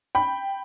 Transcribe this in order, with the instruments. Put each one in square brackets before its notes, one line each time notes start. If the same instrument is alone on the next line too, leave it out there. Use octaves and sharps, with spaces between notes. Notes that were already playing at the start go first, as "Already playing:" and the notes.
[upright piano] G5 B5